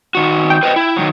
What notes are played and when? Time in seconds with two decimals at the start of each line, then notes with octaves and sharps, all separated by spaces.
0.15 D#3 F#4
0.50 G5
0.63 B4 C5 D#5
0.76 E4
0.96 D#3 F3 F#3